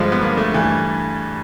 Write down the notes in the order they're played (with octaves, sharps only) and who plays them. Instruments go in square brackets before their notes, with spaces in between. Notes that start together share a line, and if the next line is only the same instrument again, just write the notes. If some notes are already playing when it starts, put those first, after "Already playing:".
Already playing: [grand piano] G2 D3 F3 G#3
B3
A#3
A3
G2 E3 A3